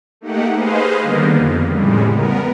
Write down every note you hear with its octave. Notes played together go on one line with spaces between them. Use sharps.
A3 A#3 D#4 G4 F#5
G#4 B4 C5 D#5 F5
D3 D#3 G3 A#3 B3 A#4
F2
A2 C#3 G3 G#3
B3 A#4